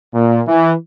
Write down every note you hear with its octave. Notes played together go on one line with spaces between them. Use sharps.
A#2
E3